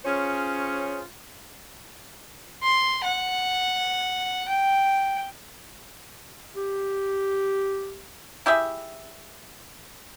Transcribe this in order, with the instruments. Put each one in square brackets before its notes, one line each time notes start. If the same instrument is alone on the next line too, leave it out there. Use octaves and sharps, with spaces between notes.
[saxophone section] C#4 F4 G#4 C5 C#5
[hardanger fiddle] C6
F#5
G5
[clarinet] G4
[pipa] E4 G4 G#4 E5